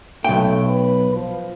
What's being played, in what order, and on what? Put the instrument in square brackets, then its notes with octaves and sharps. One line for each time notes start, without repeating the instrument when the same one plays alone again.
[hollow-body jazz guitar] B1 G5 [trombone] A3
[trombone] B4
F3